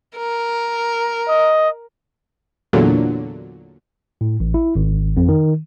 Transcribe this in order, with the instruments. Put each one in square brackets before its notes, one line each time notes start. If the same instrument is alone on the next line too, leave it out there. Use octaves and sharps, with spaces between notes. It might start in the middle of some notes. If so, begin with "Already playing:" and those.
[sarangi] A#4
[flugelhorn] D#5
[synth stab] E2 A#2 D3 F#3
[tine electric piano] A2
A1
E4
G#1
F2
D#3